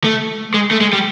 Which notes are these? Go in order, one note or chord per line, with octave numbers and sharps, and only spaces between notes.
A3
G#3
A3
G#3
G3